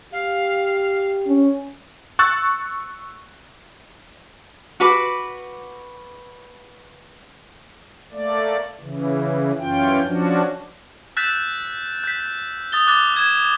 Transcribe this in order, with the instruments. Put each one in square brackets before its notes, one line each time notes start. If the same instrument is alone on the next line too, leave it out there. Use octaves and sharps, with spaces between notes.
[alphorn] G4 [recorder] F5
[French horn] C#4
[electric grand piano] C#6 E6 F#6 A6
[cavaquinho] F#4 B4 B5 D6
[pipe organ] A3 A#3 D5
C#3 E3
F#2 E3 C#4 F4 G5
F3 C#4 D4 F#4
[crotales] E6 F#6 G6 A6 B6 E7
G6 B6
D#6 A6 G7
D6 F#6 A6 G7
D#6 G#6 E7